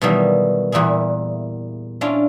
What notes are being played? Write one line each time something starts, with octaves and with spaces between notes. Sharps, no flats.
B2 D#3 E3 F#3 G3 A#3
E2 A#2 G3 E4 G#4
C#4 D4 E4 F4 C#5